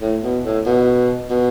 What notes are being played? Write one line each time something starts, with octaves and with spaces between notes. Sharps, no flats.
A2
B2
A2
B2
B2